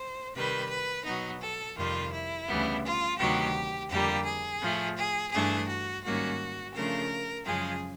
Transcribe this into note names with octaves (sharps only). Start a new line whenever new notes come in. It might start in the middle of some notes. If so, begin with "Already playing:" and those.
Already playing: C5
C3 D#3 G3 B4
B4
B2 F#3 B3 D#4
A4
F2 C3 D#3 G3 F4
E4
D2 C#3 E3 G3 B3
F4
D2 C3 D#3 F#3 B3 G4
F2 D3 G3 A#3 G4
G#4
A2 F3 A3
G#4
G2 E3 A3 D4 G#4
F#4
G#2 D#3 G3 A#3 C#4 F#4
C#3 F3 A3 D4 A#4
F#2 C#3 F3 G#3 G#4